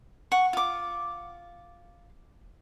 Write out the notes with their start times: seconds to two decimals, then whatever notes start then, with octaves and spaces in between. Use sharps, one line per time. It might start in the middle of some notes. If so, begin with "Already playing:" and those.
0.32 F#5 C#6
0.53 F4 D6